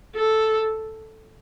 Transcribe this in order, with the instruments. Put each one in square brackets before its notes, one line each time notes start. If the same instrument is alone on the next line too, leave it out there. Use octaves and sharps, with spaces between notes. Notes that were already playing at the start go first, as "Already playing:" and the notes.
[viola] A4